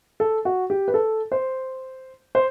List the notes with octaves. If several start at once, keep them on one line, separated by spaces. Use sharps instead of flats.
A4
F#4
G4
B4
A4
C5
C5